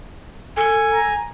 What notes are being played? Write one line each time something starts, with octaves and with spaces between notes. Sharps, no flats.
A4 G#5
A#5